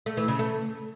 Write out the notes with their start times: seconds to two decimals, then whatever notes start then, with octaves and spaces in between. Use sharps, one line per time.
0.06 A3
0.17 E3
0.28 C#3
0.39 A3